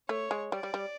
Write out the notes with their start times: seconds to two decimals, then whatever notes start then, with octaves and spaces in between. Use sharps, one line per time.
0.09 A3 C#5
0.31 G#3
0.52 G3 D5
0.63 G3
0.74 G3